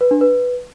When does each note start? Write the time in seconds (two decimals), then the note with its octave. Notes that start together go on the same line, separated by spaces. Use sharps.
0.01 B4
0.11 D4
0.21 B4